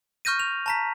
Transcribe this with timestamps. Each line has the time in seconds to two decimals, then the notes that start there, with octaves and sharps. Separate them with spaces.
0.25 C#6 F6 G6 A#6 D#7
0.40 F7
0.66 A5 A#5 B6